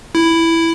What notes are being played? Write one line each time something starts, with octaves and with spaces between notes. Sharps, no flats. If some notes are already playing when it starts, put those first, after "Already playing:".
E4